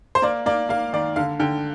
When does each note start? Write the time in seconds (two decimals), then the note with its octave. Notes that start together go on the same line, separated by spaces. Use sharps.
0.15 C5
0.22 A#3 D5
0.46 A#3 D5
0.69 A#3 F5
0.93 D#3 D5
1.16 D3 F5
1.40 D3 G5